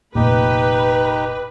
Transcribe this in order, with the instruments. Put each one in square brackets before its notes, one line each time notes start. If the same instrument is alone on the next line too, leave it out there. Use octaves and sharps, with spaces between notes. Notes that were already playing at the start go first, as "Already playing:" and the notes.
[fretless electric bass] F1 A#2 [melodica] D#4 G4 [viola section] B4